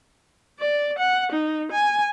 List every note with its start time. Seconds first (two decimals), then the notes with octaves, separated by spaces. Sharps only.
0.60 D5
0.98 F#5
1.32 D#4
1.72 G#5